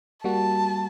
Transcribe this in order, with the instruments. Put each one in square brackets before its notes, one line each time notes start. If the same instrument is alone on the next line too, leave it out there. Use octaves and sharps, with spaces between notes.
[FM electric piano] G3 A#3 F#4 [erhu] A5